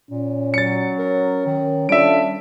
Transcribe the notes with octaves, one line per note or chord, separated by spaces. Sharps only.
A#2 C#4
F#3 A6 C#7
A#4
D#3
G3 D4 F4 A4 E5 D7